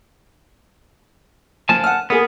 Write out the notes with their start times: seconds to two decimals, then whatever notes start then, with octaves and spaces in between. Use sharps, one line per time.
1.69 F3 G#5 A5
1.84 F#5 F6
2.10 A#3 B3 G#4